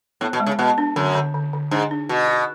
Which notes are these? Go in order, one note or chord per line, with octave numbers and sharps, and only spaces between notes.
A2 B3
B2
G#3
C#3
B2 B3
D4
F#2 D3
D3
D3
D3
G#2 D4
D4
B2 F#4
F#4